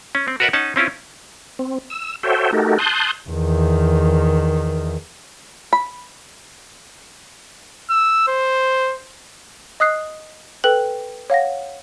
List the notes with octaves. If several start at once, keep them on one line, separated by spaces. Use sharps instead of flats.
C#4
C4
F#4 A#4 B4 D5 E5 F#5
C#4 D#4 D#5 F#5 A5
C4 C#4 E4 F4
C4
E6
F#4 A4 C5 C#5 E5 G5
A3 D#4 F#4 G4 A4 A#4
A5 C6 D#6 F#6 G6
E2 D#3
B5
E6
C5
D#5 D#6 F#6 C7
A4 B4 G5 F#6 F#7
C#5 F5 F#5 A#6